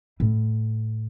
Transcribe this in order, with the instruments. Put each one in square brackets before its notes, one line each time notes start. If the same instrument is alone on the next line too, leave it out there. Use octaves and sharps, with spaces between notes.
[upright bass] A2